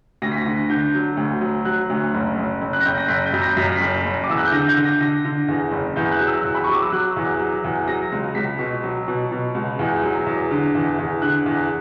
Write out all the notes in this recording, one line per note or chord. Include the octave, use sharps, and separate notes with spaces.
D2 A#6
B6
A#6
D3
D3 G6
F#3
D2
F#3
F#3 F#6
D2
F#1
F#1
F#1
F#6
A#6
F#1 G6
A#6
F#1 B6
G6
F#2
A#6
F#2 B6
A#6
F#1 B6
F#1
D6
E2 E6
F#6
G6
D3 A#6
G6
D3
A#6
D3 A#6
D3
E2
F#1
E2 G6
F#6
F#3
E6
E2
B5
F#3 C#6
D6
E6
F#3 F#6
E2
F#3
E2
F#3 A#6
C#2
C#2 B6
B2
F#3
B2
B2
C#2
E2
F#3
E2
D3
E2
E2
D3 F#6
E2